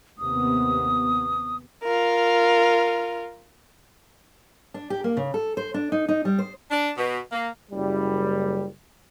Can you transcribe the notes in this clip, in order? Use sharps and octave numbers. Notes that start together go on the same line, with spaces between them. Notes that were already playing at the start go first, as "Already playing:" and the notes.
D#2 C3 B3 D#6
F4 A#4
D4
G4
A#3
C#3
A4
C5
D4
D#4
D#4
G3
C5
D4
B2
A#3
F#1 G3